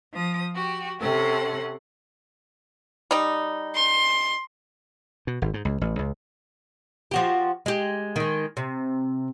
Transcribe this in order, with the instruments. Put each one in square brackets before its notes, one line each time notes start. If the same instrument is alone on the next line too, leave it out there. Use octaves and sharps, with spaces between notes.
[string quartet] F3 D#6
F#4 G4
C3 C4 C#4 A4 F#5 C6
[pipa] G3 D#4
[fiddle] C6
[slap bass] B2
G#1
G#2
C#2
A1
C#2
[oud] F3 F#4 G4
G#3 G4
D#3 G#3
C3